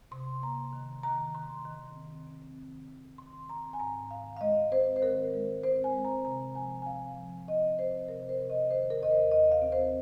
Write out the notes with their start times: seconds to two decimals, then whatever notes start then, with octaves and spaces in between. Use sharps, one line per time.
0.12 C3 C6
0.42 A#3 A#5
0.73 D#3
1.03 D#3 A#5
1.35 D#3 C6
1.65 D#3
1.96 C4
2.27 C4
2.57 D#3
2.88 D#3
3.18 D#3 C6
3.50 C4 A#5
3.73 G#5
3.80 G#2 A#5
4.10 D#3 F5
4.37 F5
4.41 G#3 D#5
4.71 C4 C5
4.96 C5
5.02 D#3 A#4
5.34 G#3
5.63 C4 C5
5.84 G#5
5.94 G#3
6.05 A#5
6.25 C3 A#5
6.55 F3 G#5
6.82 G#5
6.86 C4 F5
7.17 F3
7.47 C4 D#5
7.79 C4 C5
8.08 C3 A#4
8.29 C5
8.39 C3
8.50 D#5
8.70 D#3 C5
8.90 A#4
9.01 D#2 D#5
9.11 C5
9.31 D#2 D#5
9.52 F5
9.62 C4
9.72 C5